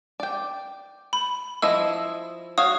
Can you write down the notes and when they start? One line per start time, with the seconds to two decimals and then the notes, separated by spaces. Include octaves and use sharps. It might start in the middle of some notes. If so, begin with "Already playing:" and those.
0.20 D5 G5
1.13 B5
1.62 F3 E4 D#5 E6
2.58 F#4 C#5 F5 D#6